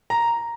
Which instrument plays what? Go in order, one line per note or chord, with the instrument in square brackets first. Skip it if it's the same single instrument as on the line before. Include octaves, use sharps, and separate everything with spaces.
[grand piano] A#5